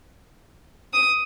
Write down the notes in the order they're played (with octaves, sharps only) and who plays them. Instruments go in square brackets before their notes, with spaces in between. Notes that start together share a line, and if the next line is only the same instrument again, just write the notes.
[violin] D#6